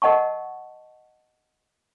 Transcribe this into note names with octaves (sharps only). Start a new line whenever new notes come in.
A#4 D#5 F#5 A5 C#6